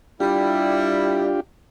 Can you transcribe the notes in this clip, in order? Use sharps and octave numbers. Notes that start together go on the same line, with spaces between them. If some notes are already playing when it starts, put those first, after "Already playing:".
G3 D4 E4 F4 G4